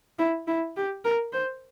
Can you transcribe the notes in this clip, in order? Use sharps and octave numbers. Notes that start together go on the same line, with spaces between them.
E4
E4
G4
A#4
C5